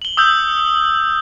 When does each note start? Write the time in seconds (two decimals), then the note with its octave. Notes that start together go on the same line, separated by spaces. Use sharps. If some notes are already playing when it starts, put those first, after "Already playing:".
0.02 F#7 G7
0.17 D#6 E6 G6